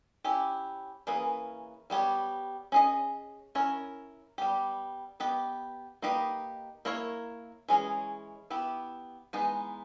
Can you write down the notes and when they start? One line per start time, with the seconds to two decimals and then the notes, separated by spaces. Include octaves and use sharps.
0.25 C#4 E4 G4
1.07 E3 A#3 C#4 G#4 B4
1.90 G3 B3 G4 C#5
2.72 C#4 G#4 D#5
3.55 C#4 E4 A#4 C#5
4.38 G3 B3 G4
5.20 B3 G4 B4 D#5
6.02 A#3 D#4 G4 B4 D#5
6.85 A#3 E4 A#4 C#5
7.68 E3 G#3 C#4 G#4 C#5
8.50 B3 E4 G4
9.33 E3 G#3 B3 D#4